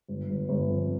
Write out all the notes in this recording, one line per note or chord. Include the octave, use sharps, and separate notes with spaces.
G1
G1
G1
F2